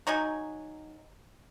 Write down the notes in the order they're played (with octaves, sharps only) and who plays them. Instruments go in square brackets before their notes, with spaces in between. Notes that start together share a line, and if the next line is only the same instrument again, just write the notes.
[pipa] F#3 D#4 D#5 G#5